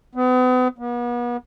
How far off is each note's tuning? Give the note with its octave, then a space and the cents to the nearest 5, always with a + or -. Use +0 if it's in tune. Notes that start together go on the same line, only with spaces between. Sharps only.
B3 +40
B3 -40